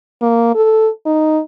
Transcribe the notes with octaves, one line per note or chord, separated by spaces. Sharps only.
A#3
A4
D#4